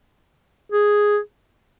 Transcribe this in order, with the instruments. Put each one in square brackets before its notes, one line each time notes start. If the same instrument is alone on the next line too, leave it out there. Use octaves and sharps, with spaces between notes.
[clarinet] G#4